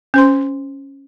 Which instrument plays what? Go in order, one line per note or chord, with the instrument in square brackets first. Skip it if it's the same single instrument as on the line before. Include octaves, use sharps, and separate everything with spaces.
[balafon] C#4 C5 C6